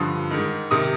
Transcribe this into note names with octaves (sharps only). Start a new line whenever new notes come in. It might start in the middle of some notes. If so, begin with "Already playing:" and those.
Already playing: G2 D3 F3 D#6
G#2 D#3
C3 D#3 D#6